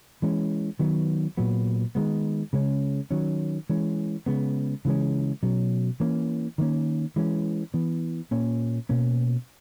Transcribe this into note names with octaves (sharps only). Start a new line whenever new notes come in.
E3 G#3 C#4
D#3 F#3 B3
A#2 F#3 B3
D#3 G#3 B3
C#3 G#3 C#4
D#3 F#3 C#4
E3 G#3 C#4
C#3 G#3 B3
C#3 E3 G#3 C#4
B2 F#3 C#4
E3 A#3 C#4
D#3 F#3 A#3 C#4
E3 G#3 C#4
E3 B3
A#2 A#3 C#4
B2 A#3 C#4